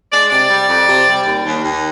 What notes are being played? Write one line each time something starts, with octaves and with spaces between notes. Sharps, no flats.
G#3 D5
C3 D5
G3
F2
C3
G3
D#2
D#2
D#2